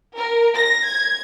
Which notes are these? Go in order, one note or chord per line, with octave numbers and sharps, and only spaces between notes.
A#4
A#6
G#6